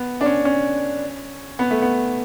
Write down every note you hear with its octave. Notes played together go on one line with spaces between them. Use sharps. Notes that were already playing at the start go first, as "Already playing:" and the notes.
Already playing: B3
D4
C#4
C#4
B3
A3
B3